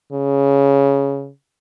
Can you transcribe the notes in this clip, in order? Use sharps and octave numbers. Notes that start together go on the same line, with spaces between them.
C#3